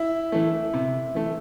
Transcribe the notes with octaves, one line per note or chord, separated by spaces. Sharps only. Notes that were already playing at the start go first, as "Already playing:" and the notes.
Already playing: E4 E5
E3 A3
C3
E3 A3